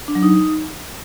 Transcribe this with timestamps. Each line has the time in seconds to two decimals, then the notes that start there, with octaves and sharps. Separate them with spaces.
0.08 D4
0.15 F#3
0.23 D#4